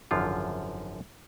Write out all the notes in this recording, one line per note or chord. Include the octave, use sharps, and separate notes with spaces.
G#1 F#2 D3 F3 F4